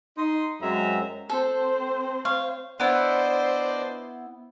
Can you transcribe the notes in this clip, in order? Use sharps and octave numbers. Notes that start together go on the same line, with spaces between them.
D#4 C6
F#2 F#3 G#3 C4 E5 A#5
C4 A4 C5
C#5 F5
B3 D4 E4 C5 D5 D#5